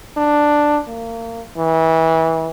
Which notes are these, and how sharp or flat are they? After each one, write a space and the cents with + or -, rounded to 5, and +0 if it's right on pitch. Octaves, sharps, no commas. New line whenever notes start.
D4 +5
A#3 -30
E3 -25